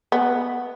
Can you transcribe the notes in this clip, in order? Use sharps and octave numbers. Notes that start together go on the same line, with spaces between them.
B3